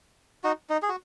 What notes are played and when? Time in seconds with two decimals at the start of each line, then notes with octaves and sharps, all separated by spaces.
0.44 D#4 F#4
0.70 D#4
0.82 G#4
0.89 F#4